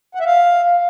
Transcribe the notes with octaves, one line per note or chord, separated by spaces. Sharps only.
F#5
E5
F5